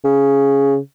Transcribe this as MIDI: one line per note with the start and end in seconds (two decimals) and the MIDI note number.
0.05 0.78 49